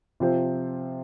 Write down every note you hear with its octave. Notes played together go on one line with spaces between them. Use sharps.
C3 F3 C4 F4 C5